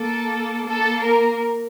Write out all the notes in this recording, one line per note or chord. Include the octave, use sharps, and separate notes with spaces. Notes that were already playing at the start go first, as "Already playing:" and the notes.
Already playing: A#3 A4
A#3 A4
A#4